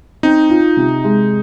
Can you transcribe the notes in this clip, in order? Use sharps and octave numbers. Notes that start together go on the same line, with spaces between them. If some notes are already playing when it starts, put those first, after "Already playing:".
C4 D#4
F4
C3
G#3